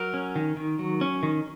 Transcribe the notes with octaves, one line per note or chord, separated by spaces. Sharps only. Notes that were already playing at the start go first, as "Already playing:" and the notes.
Already playing: F#3 A#4
C#4
D#3
D#3
F#3
C#4
D#3